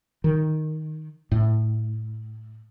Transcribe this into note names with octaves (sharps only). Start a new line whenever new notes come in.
D#3
A2